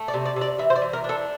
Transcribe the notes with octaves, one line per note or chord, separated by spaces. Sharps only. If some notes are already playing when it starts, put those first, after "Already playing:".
Already playing: A3
D5
C3
D5
C3
D5
E3 E5
C5
D5
E3
A#4
D4 A4